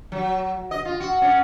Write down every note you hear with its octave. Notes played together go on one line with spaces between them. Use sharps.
F#3
D#5
F4
F#4
C#4